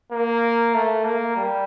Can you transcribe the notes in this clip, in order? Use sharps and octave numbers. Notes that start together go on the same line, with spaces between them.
A#3
A3
A#3
G3